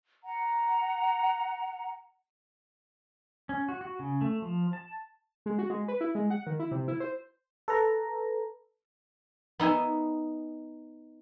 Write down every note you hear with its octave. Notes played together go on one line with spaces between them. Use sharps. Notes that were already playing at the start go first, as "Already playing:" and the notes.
F#5 A#5
C#4
F#4
F#4
C#3
A3
F3
A5
G#3
F#4
G#3
B4
E4
G#3
F#5
D#3
E4
C3
E4
C5
A4 B4 A#5
B3 D#4 E5 G#5